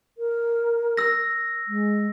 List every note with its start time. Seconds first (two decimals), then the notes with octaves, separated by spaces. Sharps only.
0.18 A#4
0.97 E6 A#6
1.68 G#3